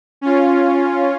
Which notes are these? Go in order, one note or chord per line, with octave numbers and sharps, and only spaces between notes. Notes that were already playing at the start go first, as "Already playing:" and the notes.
C#4 F4